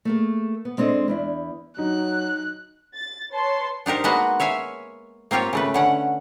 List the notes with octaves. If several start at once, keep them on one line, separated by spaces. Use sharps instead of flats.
A3 A#3 G#4
B3
G#3 C4 D4 A4 D#5
E2 D4 E4
F#3 D#4 F#6
A6
B4 C#5 A5 C6
D4 D#4 G4 A#4 C5
G#3 A#3 B3 F#4 B4 D#5
C#5 E5 F5 G#5
A#3 C4 F4 G4 C#5
C#3 A3 B4
D3 C#4 F#5